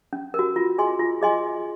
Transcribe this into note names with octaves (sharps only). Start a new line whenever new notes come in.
C#4
A#4
F#4
F4
G#4 D#5 G#5 C6
F4
G#4 D#5 G#5 C6